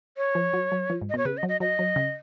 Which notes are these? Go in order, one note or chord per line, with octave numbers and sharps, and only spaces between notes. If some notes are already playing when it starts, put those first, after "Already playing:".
C#5
F3
F#3
F#3
F3
G#2
D#5
B2
C#5
C#3 B4
D#5
F#3
D#5
F#3 D#5
F#3
C#3